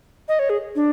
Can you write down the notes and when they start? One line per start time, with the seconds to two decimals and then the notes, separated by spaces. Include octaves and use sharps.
0.28 D#5
0.39 C#5
0.50 G#4
0.75 D4